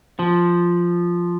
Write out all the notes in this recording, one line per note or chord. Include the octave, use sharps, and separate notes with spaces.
F3